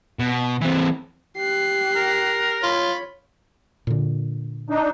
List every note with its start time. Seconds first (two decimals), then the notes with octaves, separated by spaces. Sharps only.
0.19 B2
0.62 E3 C4
1.38 G4 F#6 C7
1.96 A#4
2.63 F4 C#5 B5
3.87 A#2 D3
4.70 D4 D#4